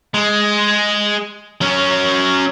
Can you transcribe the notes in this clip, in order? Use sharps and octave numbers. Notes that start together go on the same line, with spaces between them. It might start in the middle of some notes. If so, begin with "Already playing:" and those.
G#3
F#3 C#4